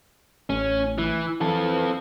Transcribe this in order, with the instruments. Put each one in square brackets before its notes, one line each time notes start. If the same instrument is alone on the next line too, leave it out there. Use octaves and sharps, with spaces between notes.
[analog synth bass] A1 [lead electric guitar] C#4
[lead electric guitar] E3
[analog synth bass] E3 [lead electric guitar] C4 A4